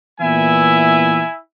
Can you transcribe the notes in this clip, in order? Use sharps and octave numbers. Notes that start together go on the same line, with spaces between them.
A#2 E3 B3 E4 E5 G#5